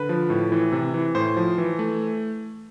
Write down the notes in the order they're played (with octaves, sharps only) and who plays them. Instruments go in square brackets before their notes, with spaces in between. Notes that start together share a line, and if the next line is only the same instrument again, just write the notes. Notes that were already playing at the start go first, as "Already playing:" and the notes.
Already playing: [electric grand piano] D3 B4
F3
A2
E3
C3
E3
A2 C5
F3
E3
A3